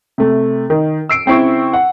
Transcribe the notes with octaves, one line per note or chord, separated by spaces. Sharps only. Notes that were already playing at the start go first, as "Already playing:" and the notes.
C3 A3
D#3
E6 C7 D7
C#3 C4 E4 C#6
F#5